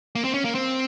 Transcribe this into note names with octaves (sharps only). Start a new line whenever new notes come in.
A#3
C4
C#4
A#3
C4